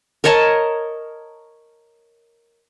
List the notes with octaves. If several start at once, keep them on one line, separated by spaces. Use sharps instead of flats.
A#4 C#5 D#5 A5